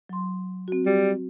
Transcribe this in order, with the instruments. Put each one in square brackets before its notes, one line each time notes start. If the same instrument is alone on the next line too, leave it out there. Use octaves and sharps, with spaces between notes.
[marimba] F#3 C6
C4 F#4
[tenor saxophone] G3